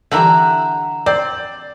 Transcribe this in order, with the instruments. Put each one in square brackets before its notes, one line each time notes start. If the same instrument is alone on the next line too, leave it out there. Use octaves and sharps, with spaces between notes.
[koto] D3 E3 G3 [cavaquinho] E5 F#5 A#5
[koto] C4 [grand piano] D5